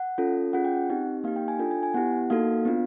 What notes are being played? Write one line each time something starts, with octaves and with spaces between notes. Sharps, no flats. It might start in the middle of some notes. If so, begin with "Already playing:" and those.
Already playing: F#5
C#4 F4 A4
C#4 F4 G#4 F#5
G5
F#5
C4 D#4 G4
A#3 D#4 G4 F5
G5
G#5
D4 F4 A4 G5
G#5
G#5
B3 E4 G4 F#5
A#3 D#4 F#4 A4 F5
B3 D4 F4